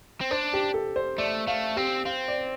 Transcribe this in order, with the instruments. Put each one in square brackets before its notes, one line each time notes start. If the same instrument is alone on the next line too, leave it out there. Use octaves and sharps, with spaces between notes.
[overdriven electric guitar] C4
[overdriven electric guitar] D4 [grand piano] C5
[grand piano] G4
A4
C5
[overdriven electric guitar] A3 [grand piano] D5
[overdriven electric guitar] A3 [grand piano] F5
[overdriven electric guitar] C4 [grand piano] G4
[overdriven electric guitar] C4 [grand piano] F5
[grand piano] D5